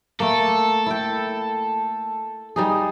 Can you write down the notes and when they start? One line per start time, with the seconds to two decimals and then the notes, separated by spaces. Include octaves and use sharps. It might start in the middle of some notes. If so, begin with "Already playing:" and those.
0.20 A3 A#3 A4
0.86 E4 G5
2.56 G3 D#4 G#4